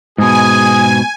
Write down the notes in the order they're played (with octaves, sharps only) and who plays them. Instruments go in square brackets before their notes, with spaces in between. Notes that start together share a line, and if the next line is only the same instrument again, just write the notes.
[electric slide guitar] G#2 B2 [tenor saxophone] G#4 [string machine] G#5